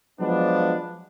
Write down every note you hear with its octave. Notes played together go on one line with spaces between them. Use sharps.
F3 F#3 G#3 B3 D4